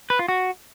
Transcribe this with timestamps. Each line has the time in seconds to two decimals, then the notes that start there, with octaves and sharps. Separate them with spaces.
0.10 B4
0.19 F4
0.28 F#4